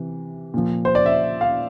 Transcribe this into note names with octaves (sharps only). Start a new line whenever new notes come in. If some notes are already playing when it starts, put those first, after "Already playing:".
Already playing: C3 E3
A#2 F3
C5
D5
E5
F5